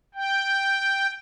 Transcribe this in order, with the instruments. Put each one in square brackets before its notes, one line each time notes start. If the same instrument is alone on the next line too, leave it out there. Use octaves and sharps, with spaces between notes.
[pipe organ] G5